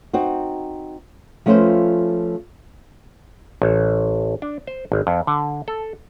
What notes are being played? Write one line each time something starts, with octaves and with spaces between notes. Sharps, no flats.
C4 D#4 F#4
F3 A3 C#4 F4 B4 C5
A1
D4
C5
G#1
F2
D3
A4